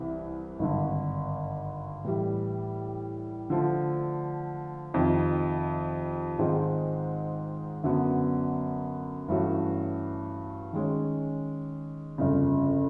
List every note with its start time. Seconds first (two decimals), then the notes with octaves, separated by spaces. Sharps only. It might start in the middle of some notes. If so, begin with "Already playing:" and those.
Already playing: C2 C3 E3
0.59 G#1 G2 D3
2.04 A2 E3 G3
3.50 D3 F3 A3
4.94 F2 C3 D#3
6.39 G#2 D#3 G#3 C4 F4
7.84 F#2 D3 F#3 B3
9.28 G2 E3 A3 C#4 F#4
10.73 D#3 G#3 C#4
12.18 G1 F2 C#3